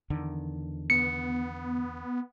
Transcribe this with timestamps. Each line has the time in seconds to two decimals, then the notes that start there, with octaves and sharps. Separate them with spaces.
0.10 E2 D3 D#3
0.90 B3 C#7